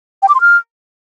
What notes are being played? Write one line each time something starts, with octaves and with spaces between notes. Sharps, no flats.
G5
D6
C6
F6